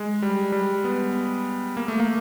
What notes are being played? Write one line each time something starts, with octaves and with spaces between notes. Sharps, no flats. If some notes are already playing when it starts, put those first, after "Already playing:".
Already playing: G#3
G3
G3
B3
A#3
A3
A#3